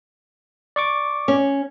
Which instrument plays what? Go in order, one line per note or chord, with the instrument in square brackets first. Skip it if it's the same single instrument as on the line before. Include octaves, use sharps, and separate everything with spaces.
[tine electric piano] D5 C#6 D6
[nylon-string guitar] C#4